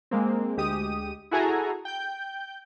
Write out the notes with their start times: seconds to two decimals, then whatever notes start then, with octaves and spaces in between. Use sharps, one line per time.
0.11 G#3 A#3 C4
0.57 D2 G#3 G4 D#6 D#7
1.31 E4 F#4 G#4 A4 G#5 A#5
1.85 G5 G6